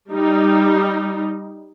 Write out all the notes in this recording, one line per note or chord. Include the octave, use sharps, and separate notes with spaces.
G3 D#4